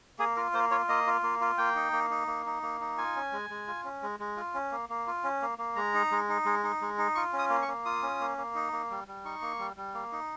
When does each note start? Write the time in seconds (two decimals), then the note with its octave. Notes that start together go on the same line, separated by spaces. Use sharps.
0.19 A#3 G#4
0.36 F4 A#4
0.54 A#3 C5
0.71 F4 C#5
0.89 A#3 D#5
1.07 F4
1.23 A#3
1.41 F4
1.58 A#3 G5
1.75 D#4
1.93 A#3
2.10 D#4
2.27 A#3
2.46 D#4
2.63 A#3
2.81 D#4
2.98 F4 G#5
3.16 C#4
3.32 G#3
3.50 G#3
3.67 F4
3.84 C#4
4.03 G#3
4.20 G#3
4.36 F4
4.54 C#4
4.72 A#3
4.89 A#3
5.07 F4
5.24 C#4
5.42 A#3
5.58 A#3
5.76 G#3 A#5
5.94 D#4
6.11 G#3
6.29 D#4
6.45 G#3
6.63 D#4
6.81 G#3
6.98 D#4
7.15 F4 C#6
7.33 C#4
7.38 D#6
7.50 A#3
7.62 C#6
7.68 A#3
7.85 F4 D#6
8.03 C#4
8.21 A#3
8.38 A#3
8.55 D#4
8.72 A#3
8.90 G3
9.08 G3
9.25 D#4 C#6
9.42 A#3
9.59 G3
9.76 G3
9.94 A#3
10.12 D#4